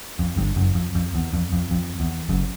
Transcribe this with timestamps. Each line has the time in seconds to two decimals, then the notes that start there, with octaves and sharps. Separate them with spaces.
0.19 F2
0.37 G1 G2
0.56 F#1 F#2
0.75 F2
0.95 F2
1.15 E2
1.34 F2
1.53 F2
1.71 F2
2.00 E2
2.29 F#1 F#2